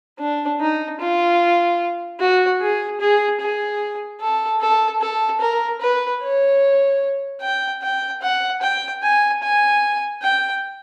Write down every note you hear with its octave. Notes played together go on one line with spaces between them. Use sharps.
D4
D#4
F4
F#4
G#4
G#4
G#4
A4
A4
A4
A#4
B4
C#5
G5
G5
F#5
G5
G#5
G#5
G5